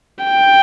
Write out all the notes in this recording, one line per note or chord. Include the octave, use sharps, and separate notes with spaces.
G5